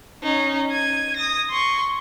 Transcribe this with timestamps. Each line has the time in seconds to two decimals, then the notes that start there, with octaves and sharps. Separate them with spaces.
0.23 C#4 D#4
0.72 G#6 D#7
1.16 D#6 A#6
1.50 C6 C#6